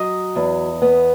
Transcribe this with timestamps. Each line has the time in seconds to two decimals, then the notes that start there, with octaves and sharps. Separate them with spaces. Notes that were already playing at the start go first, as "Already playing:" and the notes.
Already playing: F#3 D#5
0.35 E2
0.82 B3